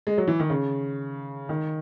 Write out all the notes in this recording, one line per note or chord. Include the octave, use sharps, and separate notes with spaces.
G#3
F#3
E3
D#3
C#3
D#3